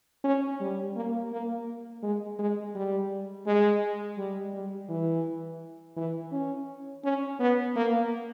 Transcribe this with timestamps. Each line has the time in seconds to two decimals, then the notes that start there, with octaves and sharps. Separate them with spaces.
0.24 C#4
0.60 G3
0.96 A#3
1.32 A#3
2.03 G#3
2.39 G#3
2.75 G3
3.46 G#3
4.18 G3
4.53 G3
4.89 E3
5.97 E3
6.32 C#4
7.04 C#4
7.40 B3
7.76 A#3